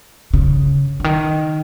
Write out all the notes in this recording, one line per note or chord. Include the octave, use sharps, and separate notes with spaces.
C#3
D3
D#3